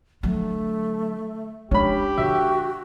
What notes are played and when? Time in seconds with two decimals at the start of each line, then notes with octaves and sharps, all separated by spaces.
0.23 D3 F#3 A3
1.71 G#3 C#4 D4 G4 B5
2.18 D3 F#4 E5